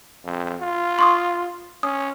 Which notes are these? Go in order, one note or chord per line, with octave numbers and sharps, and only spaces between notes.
F2
F4
C6 C#6 D#6
C#4 D#6